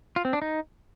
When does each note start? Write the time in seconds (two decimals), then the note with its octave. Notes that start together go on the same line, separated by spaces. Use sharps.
0.16 F4
0.25 C4
0.33 D4
0.42 D#4